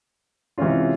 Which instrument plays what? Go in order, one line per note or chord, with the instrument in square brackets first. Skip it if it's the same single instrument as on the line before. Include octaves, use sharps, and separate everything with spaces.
[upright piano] C3 E3 G#3 C#4 F4